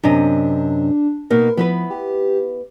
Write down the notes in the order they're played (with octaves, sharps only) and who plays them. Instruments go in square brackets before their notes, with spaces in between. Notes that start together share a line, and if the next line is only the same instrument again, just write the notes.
[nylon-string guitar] F#2 C3 D#5 [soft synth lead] D4
[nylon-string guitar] B2 A#3 D#4 [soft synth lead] A#4
[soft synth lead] F3 [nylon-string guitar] B3 E4 B4
[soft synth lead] G4